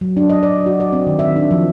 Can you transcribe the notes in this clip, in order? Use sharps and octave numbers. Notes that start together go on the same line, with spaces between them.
F#3
D4
D#5
D5
F#4
D5
C4
D#3
E5
D4
F3